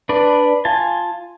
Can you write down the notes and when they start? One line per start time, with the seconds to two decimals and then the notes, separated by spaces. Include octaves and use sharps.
0.09 D4 B4 D5
0.65 F4 G#5 A5